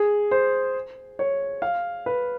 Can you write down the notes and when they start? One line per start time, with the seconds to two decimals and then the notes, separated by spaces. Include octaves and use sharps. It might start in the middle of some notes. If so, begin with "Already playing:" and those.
Already playing: G#4
0.31 C5
1.19 C#5
1.62 F5
2.06 B4